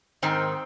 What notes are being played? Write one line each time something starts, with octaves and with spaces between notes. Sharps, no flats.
G#2 D#3 C4